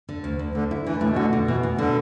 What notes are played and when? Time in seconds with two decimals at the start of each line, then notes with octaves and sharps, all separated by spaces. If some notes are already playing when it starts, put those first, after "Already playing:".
0.09 D3
0.24 D2
0.39 D2
0.55 D2 D3
0.71 E4
0.86 D3 E3
1.01 A2 A3
1.09 B2
1.16 D3 F#4
1.33 B2
1.47 B2 E3
1.63 B2
1.78 B2 D3